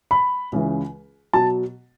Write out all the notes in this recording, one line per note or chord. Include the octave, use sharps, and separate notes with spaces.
B5
C#2 C#3 E3
B2 F#3 A5